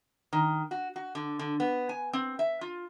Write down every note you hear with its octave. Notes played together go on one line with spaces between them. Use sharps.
D#3
F#4
F#4
D3
D3
B3
G#5
C4
E5
F4